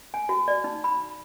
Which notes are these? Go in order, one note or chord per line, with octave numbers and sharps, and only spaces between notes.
G#5
F#4
D5
D#4
B5